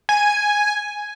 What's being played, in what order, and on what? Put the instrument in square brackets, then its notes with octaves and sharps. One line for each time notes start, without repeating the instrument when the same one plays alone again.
[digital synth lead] G#5